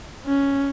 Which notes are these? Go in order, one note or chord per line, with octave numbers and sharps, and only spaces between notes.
C#4